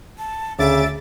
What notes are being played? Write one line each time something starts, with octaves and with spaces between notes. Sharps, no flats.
A5
D2 C#3 E5 D6 A6